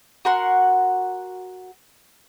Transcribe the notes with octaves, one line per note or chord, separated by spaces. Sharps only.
F#4 A#4 F#5 C6